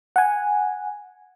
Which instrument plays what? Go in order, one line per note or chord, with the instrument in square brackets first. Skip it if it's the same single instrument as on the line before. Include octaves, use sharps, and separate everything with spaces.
[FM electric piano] F#5 G#5